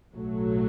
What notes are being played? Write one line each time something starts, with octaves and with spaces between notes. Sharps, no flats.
B1 A2 F#3 A3